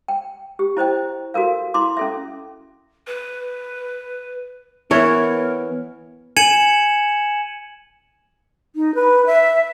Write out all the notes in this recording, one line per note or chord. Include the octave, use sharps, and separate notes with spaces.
G5
G4
E4 C5 D#5 G5
F#4 A4 A#4 F5
E4 C6 D6
C#4 A4 E5
B4
E3 B3 A#4 C#5
G#5 G#6 C#7 D#7 E7 F#7
D#4
B4
E5